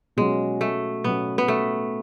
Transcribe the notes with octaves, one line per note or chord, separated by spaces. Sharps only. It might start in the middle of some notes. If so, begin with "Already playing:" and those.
B2 F#3 G#3 C#4 F#4
A3
B2 F#3 B3 C#4 F#4
B3
A3